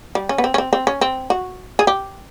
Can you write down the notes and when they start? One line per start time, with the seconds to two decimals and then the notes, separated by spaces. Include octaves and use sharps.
0.15 G3
0.29 C#4
0.38 B3
0.44 C4
0.54 C#4
0.58 C4
0.73 C4
0.87 C#4
1.01 C4
1.30 F#4
1.79 G#4
1.87 G4